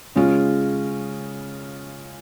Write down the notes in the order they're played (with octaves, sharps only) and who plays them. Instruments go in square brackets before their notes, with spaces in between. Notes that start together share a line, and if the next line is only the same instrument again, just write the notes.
[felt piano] C#3 G#3 C#4 F4